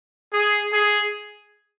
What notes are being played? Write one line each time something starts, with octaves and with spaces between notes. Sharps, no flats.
G#4
G#4